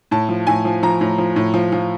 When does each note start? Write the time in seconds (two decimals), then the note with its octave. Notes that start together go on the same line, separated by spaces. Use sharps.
0.11 A2 A5
0.29 F3
0.47 A2 G#5
0.65 F3
0.83 F3 A#5
1.01 A2
1.18 F3
1.36 A2
1.54 F3
1.72 F3